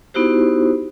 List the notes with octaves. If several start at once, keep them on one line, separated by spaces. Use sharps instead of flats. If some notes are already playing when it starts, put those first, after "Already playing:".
B3 D#4 E4 F#4 G4 C5